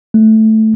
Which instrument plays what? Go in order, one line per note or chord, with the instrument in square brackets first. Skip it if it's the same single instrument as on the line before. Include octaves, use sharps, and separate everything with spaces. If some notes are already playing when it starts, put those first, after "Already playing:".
[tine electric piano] A3